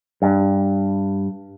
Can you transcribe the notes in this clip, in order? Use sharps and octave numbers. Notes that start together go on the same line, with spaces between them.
G2